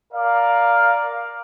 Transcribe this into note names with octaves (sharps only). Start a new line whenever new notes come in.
A#4 D5 F5